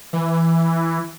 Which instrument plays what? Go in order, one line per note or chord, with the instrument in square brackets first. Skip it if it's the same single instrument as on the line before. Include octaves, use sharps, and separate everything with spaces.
[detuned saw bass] E3